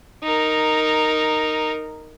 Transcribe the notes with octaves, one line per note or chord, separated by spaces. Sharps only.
D#4 A#4